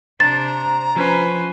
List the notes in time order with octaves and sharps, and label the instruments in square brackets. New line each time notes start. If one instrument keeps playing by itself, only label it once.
[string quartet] C3 D4 [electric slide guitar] C5 [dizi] A#5 [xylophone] A6
[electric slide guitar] F3 [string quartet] C#4 B4 C5